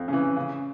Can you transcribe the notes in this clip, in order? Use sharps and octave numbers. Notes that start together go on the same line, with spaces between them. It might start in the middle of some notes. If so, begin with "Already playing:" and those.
Already playing: F2
C#3 E3
C#3